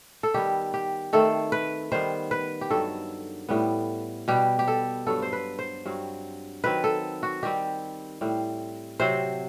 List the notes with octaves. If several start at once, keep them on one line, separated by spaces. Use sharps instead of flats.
A4
D#3 G3 B3 G4
G4
D#3 A3 C4 A4
B4
D#3 G3 B3 C5
B4
G4
G2 D#3 F#3 A4
A2 G3 B3
B2 G3 B3 G4
G4
A4
G2 F#3 B3 A4
C5
B4
C5
G2 F#3 C4
D#3 F#3 C4 B4
A4
F#4
D#3 G3 C4 G4
A2 G3 C4
C3 F#3 C4 C5